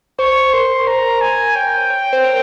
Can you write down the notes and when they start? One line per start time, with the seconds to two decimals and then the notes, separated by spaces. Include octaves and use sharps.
0.19 C5 C#6
0.53 A#4 C6
0.81 A#4
0.87 C5 A#5
1.21 G#5
1.55 C#5 G5
1.90 C#5
2.13 C5
2.24 A#4